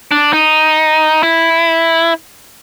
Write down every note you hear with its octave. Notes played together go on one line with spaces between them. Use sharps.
D4
D#4
E4